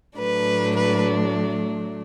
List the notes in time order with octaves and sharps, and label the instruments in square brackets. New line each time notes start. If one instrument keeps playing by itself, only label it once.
[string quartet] A2 F#3 A3 D4 B4
B4